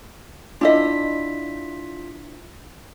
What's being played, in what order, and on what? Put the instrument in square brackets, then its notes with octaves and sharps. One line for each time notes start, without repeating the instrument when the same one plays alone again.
[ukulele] D4 E4 D#5 [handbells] F4 B6